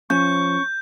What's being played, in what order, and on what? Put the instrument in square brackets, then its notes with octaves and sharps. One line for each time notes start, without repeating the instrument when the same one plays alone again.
[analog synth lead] F3 [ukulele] C#4 [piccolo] C#6 [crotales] G6